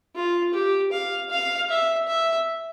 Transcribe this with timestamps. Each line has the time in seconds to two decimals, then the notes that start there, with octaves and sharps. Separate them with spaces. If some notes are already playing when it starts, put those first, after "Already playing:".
0.15 F4
0.54 G4
0.92 F5
1.31 F5
1.70 E5
2.08 E5